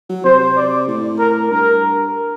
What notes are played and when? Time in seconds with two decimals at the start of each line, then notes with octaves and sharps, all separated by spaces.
0.10 F#3
0.24 C3 C5
0.57 D5
0.88 A2
1.19 A#4
1.51 G2 A#4